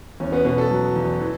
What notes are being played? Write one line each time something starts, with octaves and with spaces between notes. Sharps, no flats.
E2 C#4
B3
B2 B3
A4
F#3
E2
E3